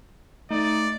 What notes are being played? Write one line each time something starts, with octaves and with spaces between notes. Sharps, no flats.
A3 D#4 D5